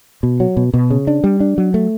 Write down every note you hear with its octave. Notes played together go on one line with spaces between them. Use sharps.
B2
F#3
B2
B2
C#3
D4
G3
D4
F#3
A3